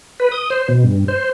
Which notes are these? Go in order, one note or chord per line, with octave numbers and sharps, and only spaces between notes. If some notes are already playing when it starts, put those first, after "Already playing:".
B4
D#6
C5
B2
G2
C5